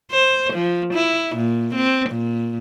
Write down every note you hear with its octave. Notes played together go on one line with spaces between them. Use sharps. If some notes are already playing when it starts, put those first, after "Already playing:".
C5
F3
E4
A#2
C4
A#2